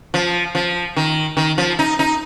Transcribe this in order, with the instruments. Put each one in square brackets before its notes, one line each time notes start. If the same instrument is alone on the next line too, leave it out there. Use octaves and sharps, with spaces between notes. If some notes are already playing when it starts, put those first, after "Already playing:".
[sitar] F3
F3
D#3
D#3
F3
D#4
D#4